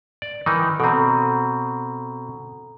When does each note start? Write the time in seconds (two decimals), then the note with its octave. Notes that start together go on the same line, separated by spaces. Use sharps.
0.22 D5
0.46 D#3 E3 D#4
0.80 B2 C4 A4 A#5